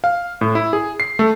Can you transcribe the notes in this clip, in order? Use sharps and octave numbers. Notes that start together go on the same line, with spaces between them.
F5
A2
E4
G#4
C7
A3